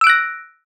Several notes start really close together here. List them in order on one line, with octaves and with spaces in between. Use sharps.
E6 D7 F#6 A#6